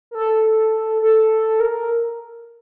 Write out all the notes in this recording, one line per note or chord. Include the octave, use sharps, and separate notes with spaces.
A#4
A4
A4
A#4